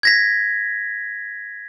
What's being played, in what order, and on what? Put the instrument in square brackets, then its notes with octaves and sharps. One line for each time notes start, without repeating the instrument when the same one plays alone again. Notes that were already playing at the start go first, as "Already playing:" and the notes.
[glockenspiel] G#6 A#6 B6